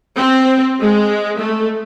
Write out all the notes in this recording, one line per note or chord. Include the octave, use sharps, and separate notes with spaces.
C4
G#3
A3